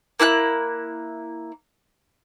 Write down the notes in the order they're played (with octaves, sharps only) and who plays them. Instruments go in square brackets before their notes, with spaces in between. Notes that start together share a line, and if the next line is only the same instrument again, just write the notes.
[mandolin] A#3 E4 A5 F#6